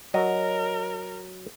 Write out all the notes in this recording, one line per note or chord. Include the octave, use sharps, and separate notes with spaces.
F#3 A#4 D#5